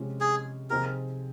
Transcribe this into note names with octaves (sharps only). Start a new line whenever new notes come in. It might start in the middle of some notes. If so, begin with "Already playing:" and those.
Already playing: C3 F3 G#3 C#4 G4
G#4
C3 F3 C4 D#4 G#4 A#4